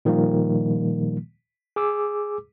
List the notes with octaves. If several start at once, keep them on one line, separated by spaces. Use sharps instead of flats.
A#2 D#3 F3 G3 A#3
G#4 D6 E6